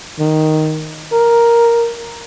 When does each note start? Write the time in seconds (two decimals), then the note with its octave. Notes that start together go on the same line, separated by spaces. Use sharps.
0.19 D#3
1.12 A#4